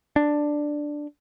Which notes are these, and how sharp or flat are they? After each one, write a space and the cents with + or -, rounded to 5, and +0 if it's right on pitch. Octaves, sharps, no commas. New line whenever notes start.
D4 +5